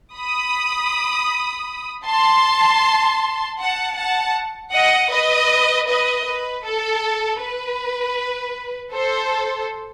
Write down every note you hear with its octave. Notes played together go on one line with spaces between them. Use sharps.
B5 D#6
A5 C6
F#5 A5
F#5 A5
D#5 F#5
B4 D#5
B4 D#5
B4
A4
B4
A4 C5